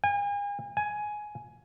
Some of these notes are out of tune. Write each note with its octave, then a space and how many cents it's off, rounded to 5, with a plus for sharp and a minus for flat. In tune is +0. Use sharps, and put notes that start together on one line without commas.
G#5 -40
G#5 +10